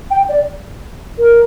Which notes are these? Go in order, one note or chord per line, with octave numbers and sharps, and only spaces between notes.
G5
D5
A#4